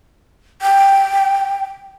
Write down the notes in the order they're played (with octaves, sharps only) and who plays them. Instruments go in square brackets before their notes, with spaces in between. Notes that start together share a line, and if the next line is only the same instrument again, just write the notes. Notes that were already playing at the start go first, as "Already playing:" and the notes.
[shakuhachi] G5